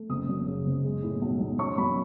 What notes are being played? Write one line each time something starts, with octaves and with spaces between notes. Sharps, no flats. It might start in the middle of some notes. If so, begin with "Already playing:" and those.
Already playing: A3
F#1 D#6
F#2
C#3
F#1
G#3
A2
B1
B1
C#4 C#6
F#2 B5